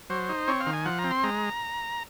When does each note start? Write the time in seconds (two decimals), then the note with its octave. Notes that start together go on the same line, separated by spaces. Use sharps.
0.10 F#3 C5
0.29 D#4
0.48 C4 C#5
0.60 F5
0.67 D#3
0.73 G#5
0.85 F3 F#5
0.99 A#5
1.04 C4
1.11 C6
1.24 G#3 A#5